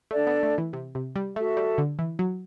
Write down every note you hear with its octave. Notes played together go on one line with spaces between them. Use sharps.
A3 D4 A4 D5
B3
A3
E3
C3
C3
G3
A3 F#4 A4 E5
G3
D3
E3
F#3